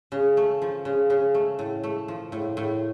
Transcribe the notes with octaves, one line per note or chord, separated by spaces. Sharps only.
C#3
A3
F3
C#3
C#3
A3
A2
A3
F3
A2
A2